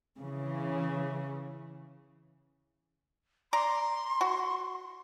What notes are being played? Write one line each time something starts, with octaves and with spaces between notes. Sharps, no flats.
C#3 E3
D5 A#5 C6
F#4